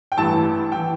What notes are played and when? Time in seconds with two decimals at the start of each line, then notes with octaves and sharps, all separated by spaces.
0.12 G5
0.17 A1 G2 E3 A5
0.72 E3 G5